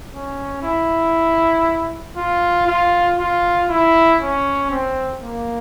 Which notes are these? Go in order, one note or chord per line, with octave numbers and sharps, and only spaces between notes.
C#4
E4
F4
F4
F4
E4
C#4
C4
A#3